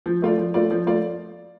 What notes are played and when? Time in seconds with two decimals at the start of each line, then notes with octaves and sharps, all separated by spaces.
0.06 F3
0.22 A3 F4 D5
0.38 F3
0.54 A3 F4 D5
0.70 F3
0.87 A3 F4 D5